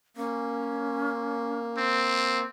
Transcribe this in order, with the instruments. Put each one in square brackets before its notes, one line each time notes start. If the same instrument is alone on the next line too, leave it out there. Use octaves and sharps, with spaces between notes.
[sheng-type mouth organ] A#3 [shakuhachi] C#4
[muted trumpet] C4